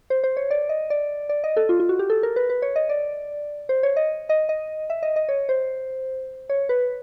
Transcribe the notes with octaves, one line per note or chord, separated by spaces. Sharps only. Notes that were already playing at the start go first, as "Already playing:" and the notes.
C5
C5
C#5
D5
D#5
D5
D5
D#5
A4
F4
F4
F#4
G4
A4
A#4
B4
B4
C#5
D#5
D5
C5
C#5
D#5
D#5
D#5
E5
D#5
D#5
C#5
C5
C#5
B4